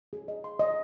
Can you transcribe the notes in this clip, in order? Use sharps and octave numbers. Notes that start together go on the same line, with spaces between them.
G#4
D#5
C6
D#5